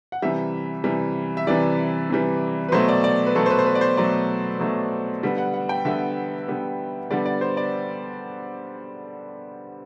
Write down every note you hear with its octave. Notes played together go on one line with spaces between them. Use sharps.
F#5
C3 E3 G3 E5
C3 E3 G3
E5
C3 E3 G3 D5
C3 E3 G3
B4
B2 F#3 A3 C5
D5
D5
B4
B2 F#3 A3 A4
C5
B4
C5
B4
D5
C5
B2 F#3 A3 D5
B2 F#3 A3
D3 G3 B3
F#5
F#5
G5
D3 G3 B3 E5
D3 G3 B3
D3 G3 B3 D5
D5
C5
D5